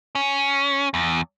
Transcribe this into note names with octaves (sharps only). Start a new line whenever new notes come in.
C#4
E2